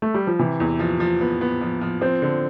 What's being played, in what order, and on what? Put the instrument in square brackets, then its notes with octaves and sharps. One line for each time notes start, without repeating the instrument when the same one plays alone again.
[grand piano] A3
G3
F3
[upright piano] C3 [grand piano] E3
[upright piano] E2
F3
F3
B3
B3
F3
F3
[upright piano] F3 [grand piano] C4
[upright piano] D3